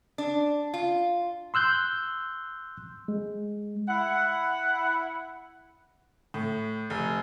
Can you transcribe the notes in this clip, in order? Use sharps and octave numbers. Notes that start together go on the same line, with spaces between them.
D4
F4
C6 E6 F#6 G6
G#3
E4 F#5
A2
F1